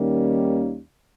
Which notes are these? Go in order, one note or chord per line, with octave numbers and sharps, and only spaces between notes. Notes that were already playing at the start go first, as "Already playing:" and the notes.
Already playing: D#2 D#3 G3 A#3 C#4